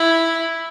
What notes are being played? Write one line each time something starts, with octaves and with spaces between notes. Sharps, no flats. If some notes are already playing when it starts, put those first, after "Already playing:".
Already playing: E4